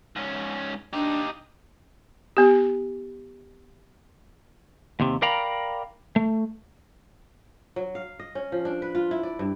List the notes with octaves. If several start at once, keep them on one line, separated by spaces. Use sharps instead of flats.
G#2 C#4
D4 D#4 G4
B3 G4
D#2 C3
A#4 D5 F5 G5 A#5 B5
A3
F#3
F5
D#5
C#4
F3
D4
B4
F4
E4
D5
G2